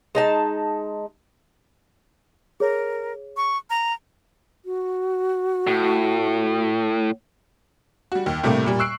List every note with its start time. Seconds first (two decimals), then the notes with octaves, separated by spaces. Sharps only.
0.15 G#3 D#4 A5
2.60 G#4 A#4 C#5
3.37 C#6
3.70 A#5
4.65 F#4
5.67 A2
8.12 G3 F#4
8.26 D#2
8.44 A2 C3 G3 A3 A#3
8.66 A#2 G3
8.79 C#6 E6 F#6 C7 D7